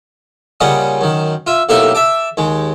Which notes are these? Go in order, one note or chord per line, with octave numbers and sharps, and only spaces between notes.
A#2 C#3 G3 C#4 D#5 F#5
F#2 D#3
F4 E5
B1 A2 A#3 G4 E5 C6
E5 A5 D6
D#2 G#3